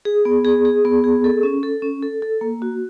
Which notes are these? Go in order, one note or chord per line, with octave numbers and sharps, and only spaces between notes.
G#4
B3
G#4
G#4
B3
G#4
A4
C#4
A4
C#4
A4
A4
A#3
F#4